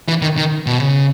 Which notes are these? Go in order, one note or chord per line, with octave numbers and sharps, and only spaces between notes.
E3
D#3
D#3
B2
C#3